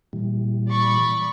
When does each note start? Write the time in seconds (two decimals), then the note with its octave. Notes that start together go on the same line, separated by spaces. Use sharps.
0.13 A#2 E3 G3
0.69 D5 B5 C#6